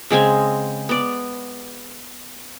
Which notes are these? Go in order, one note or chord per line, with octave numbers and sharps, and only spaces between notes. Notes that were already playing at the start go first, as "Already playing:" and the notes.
C#3 G#3 C4 G#5
B3 D5